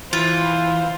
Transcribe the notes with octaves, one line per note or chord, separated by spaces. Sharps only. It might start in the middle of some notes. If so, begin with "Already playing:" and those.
E3 F4 C5